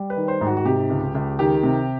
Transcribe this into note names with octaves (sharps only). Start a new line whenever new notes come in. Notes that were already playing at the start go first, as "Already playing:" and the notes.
Already playing: G3
B4
D#3
C5
G#2
F#4
F#4
C3 G4
C#2
C#2
D#3 G4
C3